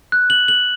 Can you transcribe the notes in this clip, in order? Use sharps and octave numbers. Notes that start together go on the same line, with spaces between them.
F#6
F#7
F#7